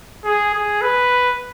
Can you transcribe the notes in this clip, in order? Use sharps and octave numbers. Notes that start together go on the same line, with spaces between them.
G#4
G#4
B4